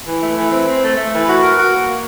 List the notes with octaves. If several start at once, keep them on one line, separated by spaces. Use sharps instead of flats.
E3
A3
E3
C4
C4
A3
A3
E3
F#4
A#4
F#4
A#3
A#3